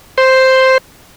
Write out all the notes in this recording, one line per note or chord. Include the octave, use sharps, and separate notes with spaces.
C5